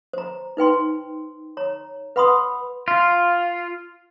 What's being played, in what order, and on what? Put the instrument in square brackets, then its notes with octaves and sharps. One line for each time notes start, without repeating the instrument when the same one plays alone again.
[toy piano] C5 A#5
D#4 B4 G5 C6
C#5 A#5
B4 F#5 B5 C6 D#6
[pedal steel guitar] F4